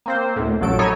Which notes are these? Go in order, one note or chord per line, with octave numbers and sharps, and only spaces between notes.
A#3 C4 C5
D2 A2
A#1 F#2 F#3 A4 D7
D#4 E4 A4 C#5 G#5